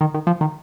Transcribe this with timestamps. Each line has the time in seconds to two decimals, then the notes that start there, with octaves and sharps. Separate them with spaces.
0.01 D#3
0.14 D#3
0.27 F3
0.41 D#3